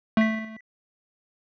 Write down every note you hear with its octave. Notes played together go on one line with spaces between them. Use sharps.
A3 B6